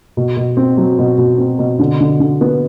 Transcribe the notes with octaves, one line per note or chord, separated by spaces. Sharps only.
B2
B2
C4
F#3
B2
B2
C4
B2
D3
D3
D3
B3